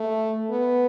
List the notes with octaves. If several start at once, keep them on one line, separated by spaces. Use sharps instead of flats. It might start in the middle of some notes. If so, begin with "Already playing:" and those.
Already playing: A3
B3